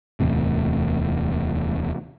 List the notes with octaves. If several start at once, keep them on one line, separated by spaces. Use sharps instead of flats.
D1 E2 A2 C3